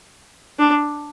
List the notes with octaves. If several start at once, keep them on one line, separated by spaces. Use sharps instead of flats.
D4